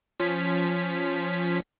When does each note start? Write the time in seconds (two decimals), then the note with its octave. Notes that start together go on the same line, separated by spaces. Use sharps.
0.20 F3 C#4 B6